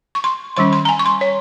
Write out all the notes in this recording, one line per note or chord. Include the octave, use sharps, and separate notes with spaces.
C#6
C6
D#3 G3 C#4 C6
C6
A#5
G#5
C#6
C6
C#5